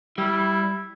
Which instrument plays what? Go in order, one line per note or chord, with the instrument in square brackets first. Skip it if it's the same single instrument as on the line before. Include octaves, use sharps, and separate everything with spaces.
[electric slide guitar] G3 [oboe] E4